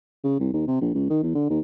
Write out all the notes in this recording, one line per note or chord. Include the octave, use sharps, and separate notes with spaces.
C#3
C2
D#2
C3
A#1
C#2
D#3
E2
D3
D#2